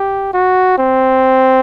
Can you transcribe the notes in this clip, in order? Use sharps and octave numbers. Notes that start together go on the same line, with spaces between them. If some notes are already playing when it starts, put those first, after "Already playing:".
Already playing: G4
F#4
C4